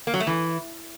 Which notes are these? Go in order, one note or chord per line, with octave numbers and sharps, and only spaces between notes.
A#3
F#3
A3
E3